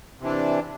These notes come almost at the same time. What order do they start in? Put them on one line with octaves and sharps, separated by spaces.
C3 E3 D4